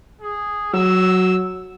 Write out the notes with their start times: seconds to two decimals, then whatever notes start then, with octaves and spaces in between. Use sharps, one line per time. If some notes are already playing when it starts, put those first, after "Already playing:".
0.21 G#4
0.73 F#3 E6